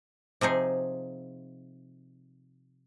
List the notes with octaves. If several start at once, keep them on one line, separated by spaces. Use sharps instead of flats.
C3 F3 D#4 G#4